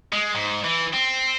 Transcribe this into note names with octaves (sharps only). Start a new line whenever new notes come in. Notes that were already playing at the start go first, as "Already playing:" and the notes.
G#3
G#2
E3
C4